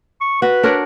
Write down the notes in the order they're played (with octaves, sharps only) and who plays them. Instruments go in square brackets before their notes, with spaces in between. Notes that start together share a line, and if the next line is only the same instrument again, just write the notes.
[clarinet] C#6
[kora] F#4 [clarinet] B4
[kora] D4 A#4 C#5